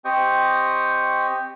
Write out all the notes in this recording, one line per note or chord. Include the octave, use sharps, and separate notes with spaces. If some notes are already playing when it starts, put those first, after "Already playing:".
C4 G4 D#5 G5 C#6